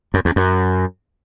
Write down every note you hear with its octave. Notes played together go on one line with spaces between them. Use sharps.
F#2
E2
F#2